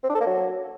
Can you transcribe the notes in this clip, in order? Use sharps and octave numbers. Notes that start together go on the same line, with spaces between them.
C4
D4
A4
A#3
F#3